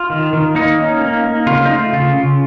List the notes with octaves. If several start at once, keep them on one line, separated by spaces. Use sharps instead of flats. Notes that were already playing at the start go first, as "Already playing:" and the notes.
Already playing: F4
D#3
D#3
A#3 D#4
C#4
A#3
A#3
C#3 F4
D#4
A3 F4
C#3 F4
C#3